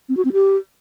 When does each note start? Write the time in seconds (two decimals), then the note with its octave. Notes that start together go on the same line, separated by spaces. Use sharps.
0.09 C4
0.17 F#4
0.25 C4
0.33 G4